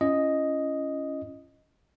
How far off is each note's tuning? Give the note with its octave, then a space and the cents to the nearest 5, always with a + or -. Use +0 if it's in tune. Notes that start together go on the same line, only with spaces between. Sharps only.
C#4 +0 E4 +45 D#5 +0